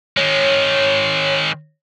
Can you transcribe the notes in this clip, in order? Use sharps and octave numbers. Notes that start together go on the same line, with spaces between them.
D#3 G#3 C#5